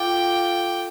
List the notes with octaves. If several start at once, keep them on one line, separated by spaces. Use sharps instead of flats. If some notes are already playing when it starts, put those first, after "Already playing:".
Already playing: F4 A4 D5 G5